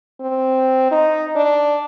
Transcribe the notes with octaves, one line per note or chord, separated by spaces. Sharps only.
C4
D#4
D4